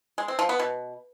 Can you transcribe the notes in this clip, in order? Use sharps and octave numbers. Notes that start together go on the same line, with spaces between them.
G#3
C4
F3
B3
B2